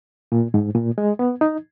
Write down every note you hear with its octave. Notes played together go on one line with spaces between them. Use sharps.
A#2
G#2
A#2
G#3
B3
D#4